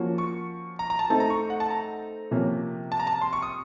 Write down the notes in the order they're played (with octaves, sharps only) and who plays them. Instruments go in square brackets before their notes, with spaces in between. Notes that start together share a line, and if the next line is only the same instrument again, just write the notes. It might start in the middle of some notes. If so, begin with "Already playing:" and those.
Already playing: [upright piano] F3 A#3 C#4 F#4
[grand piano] C#6
A#5
A#5
A5
[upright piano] A3 C4 D#4 [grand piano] A5
[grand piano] A#5
C#6
F#5
A5
A#5
[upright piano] C3 F3 A#3 C#4
[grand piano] A5
A#5
A5
C6
C#6
D#6